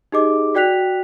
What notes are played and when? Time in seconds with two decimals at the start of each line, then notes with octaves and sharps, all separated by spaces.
0.12 D#4 G4 G#4 D#5 D6
0.54 F#4 D5 G5 F#6 B6 F7